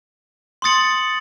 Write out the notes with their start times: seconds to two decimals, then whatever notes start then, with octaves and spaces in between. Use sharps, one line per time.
0.62 C6 D#6 A6 C#7 F#7